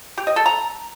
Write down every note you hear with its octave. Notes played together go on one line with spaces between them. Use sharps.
G4
D#5
A4
A#5